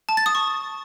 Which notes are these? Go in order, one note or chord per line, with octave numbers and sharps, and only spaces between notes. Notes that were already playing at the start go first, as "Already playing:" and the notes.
A5
A6
D#6
C#6